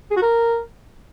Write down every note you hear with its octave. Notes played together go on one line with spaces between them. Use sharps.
G#4
F#4
A#4